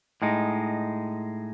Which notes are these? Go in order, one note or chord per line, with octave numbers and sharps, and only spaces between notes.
A2 G#3 D#4